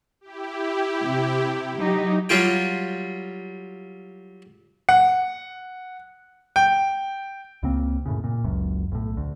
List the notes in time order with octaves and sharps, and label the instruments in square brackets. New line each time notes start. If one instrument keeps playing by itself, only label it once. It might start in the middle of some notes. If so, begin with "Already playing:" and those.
[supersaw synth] E4 G4
[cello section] C3
F#3 D#4 G4
[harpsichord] F#3 G3 F4 G5
[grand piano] F#5
G5
[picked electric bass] C#2 C#3 A#3 C4
F#2 A2 C#3
A#2
F#1 C#2 F#2
B1 A2
D2